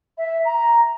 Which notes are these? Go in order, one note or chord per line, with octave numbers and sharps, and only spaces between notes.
E5
A#5